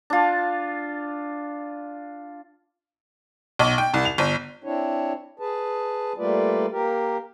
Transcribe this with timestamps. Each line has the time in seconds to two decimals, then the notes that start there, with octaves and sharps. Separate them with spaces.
0.10 D4 F4
3.59 B1
3.78 G5
3.94 C2
4.05 F7
4.18 G1
4.64 C4 D4 E4 C#5
5.40 G#4 B4 A5
6.18 G3 A3 A#3 F4 B4 D5
6.71 A#3 G4 A#4